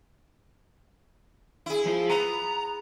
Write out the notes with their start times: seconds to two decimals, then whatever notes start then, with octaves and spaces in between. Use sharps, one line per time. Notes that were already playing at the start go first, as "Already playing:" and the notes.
1.66 E4 G#4
1.86 F3 F4
2.10 B3 A#5